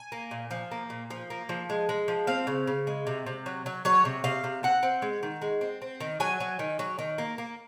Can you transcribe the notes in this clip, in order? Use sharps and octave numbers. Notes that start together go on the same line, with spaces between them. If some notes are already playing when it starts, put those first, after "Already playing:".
Already playing: G#5
A#3
A#2
F3
A#3
A#2
F3
A#3
F3
G#3
G#3
F3
C4 F5
C#3
C#3
G#3
C3
C3
F#3
F#3
F#3 C#5
C3
C3 F5
C3
C4 F#5
C4
G#3
D#3
G#3
C4
C4
D#3
F#3 G#5
F#3
D#3
F#3
D#3
A#3
A#3